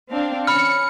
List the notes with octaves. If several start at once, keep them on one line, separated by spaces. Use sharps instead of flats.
C4 D4 F5
C#4 B5 F6 C#7